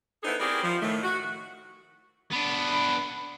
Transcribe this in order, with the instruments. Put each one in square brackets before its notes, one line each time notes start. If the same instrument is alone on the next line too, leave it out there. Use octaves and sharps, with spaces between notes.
[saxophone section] B3 D#4 E4 G#4 A4 C5
C4 E4 G4 G#4 A#4 D5
F3
A2 D#3 A3
F#4
[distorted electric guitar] B3 D4 [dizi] B5